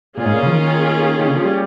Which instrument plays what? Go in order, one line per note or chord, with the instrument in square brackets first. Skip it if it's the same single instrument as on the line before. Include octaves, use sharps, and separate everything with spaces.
[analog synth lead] A#2 [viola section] A#3 C#4 F4 G#4
[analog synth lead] G#2
A#2
C#3
F3
D#3
D#3
C#3
F3
G3